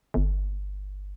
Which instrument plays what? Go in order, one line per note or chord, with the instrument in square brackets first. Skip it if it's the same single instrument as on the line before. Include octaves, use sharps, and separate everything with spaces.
[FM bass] G1